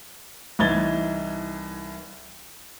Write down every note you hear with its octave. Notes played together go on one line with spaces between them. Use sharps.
C2 E3 D#4 G#6 A6 G7